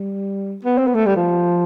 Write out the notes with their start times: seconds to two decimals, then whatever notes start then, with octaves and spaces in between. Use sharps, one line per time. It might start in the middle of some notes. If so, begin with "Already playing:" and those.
Already playing: G3
0.64 B3
0.78 C4
0.87 B3
0.95 A3
1.06 G3
1.16 F3